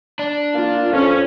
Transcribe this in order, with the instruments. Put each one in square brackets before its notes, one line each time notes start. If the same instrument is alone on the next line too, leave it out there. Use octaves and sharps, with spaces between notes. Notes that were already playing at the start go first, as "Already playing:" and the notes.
[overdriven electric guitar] D4
[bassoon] A#3 [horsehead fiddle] F4
[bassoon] F2 [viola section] C#4